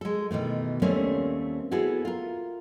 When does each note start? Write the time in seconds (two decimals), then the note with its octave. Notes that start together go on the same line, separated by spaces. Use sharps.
0.01 G#3 A4
0.31 B2 D#3 E3 A3
0.82 D#2 G3 A3 A#3 C4 C#4
1.71 B3 E4 F#4 G#4 A4
2.05 F4 A#4